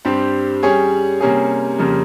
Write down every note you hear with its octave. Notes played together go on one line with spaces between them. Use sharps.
G2 G3 C4 G4
G3 C#4 G#4 C#5
C3 G3 A#3 C#4 G#4
F2 C#3 G3 A#3